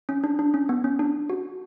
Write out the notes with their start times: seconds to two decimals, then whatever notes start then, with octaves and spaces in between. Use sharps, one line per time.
0.09 C#4
0.24 D4
0.39 D4
0.54 C#4
0.69 B3
0.84 C#4
0.99 D4
1.30 F#4